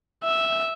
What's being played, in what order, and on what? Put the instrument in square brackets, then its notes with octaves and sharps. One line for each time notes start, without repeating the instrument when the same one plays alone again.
[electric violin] E5